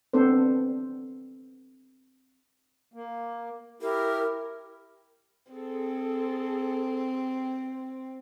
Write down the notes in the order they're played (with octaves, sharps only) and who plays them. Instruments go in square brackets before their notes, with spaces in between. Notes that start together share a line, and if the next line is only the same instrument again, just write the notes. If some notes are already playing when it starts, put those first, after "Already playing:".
[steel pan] B3 C4 D4 A4 C5
[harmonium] A#3
[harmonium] E4 G4 [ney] A#4
[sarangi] C4 [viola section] G#4 A4